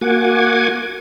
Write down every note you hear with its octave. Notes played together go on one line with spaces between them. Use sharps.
A#3 F#4 F#5 G#5 D6 G#6